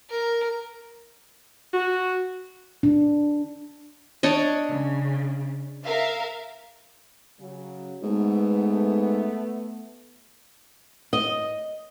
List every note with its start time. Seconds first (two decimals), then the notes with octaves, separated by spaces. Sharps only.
0.10 A#4
1.73 F#4
2.83 D4
4.23 D4 C#5 D#5
4.69 C#3
5.85 A#4 E5 F5
7.40 C#3 F#3
8.03 G#2 A3 B3
11.13 D#5